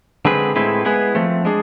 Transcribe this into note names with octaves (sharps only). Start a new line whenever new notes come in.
D3 G#3 C4 G#4 B4
A2 G#3 C4 E4 B4
G#3 B3 E4 G#4 B4
F3 A3 C4
G#3 D4 G#4